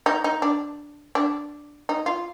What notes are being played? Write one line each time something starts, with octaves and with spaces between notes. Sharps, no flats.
D#4
D#4
D4
D4
D#4
F4